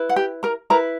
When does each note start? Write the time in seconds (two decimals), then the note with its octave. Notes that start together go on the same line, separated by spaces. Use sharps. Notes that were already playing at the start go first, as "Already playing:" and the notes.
Already playing: E4 B4
0.09 F#5
0.16 G4 G5
0.43 A#4 A#5
0.70 E4 A#4 B4 A#5